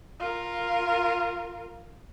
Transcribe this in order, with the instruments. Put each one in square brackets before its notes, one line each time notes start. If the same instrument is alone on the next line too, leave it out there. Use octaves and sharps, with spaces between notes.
[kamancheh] F4 A#4